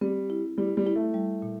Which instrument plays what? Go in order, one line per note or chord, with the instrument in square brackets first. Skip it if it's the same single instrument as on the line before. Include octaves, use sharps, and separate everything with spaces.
[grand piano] G3 [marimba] C4
[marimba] E4
[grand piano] G3 [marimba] E4
[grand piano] G3
[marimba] E4
[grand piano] A3
[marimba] G3
A#2